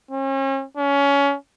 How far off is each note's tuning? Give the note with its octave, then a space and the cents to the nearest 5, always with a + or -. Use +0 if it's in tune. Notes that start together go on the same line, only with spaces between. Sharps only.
C#4 -40
C#4 +20